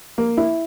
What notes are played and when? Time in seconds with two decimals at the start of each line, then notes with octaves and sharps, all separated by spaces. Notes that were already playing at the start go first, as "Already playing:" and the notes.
0.18 A#3
0.37 E4